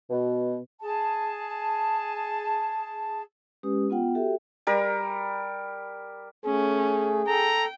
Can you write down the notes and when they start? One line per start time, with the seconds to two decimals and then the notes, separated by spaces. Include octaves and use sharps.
0.10 B2
0.81 G#4 A5
3.63 G#3 C#4 G4 B4 D#6
3.90 B3 F4 F#5 G5
4.15 F#4 G4 A4 E5 G5
4.67 G3 A#4
6.45 A3 C#4 G#4
7.27 A4 G5 A#5